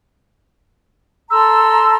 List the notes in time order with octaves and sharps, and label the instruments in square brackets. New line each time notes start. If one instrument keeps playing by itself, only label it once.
[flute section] A4 A#5 C6 [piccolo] E6